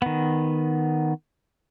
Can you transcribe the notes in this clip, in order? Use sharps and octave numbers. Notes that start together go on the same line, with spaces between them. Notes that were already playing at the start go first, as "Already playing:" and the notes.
D#3 B3